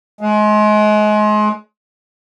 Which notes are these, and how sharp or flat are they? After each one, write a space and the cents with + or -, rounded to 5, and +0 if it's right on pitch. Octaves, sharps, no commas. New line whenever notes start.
G#3 +30